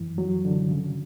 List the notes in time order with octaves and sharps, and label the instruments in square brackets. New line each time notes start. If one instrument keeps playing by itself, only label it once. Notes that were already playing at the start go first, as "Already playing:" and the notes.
Already playing: [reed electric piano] F#2 E3
F#3
D3
C#3